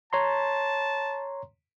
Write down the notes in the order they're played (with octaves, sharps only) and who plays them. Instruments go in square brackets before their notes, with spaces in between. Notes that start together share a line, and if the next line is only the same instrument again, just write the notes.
[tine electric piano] C#5 A#5 C6 [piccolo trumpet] A5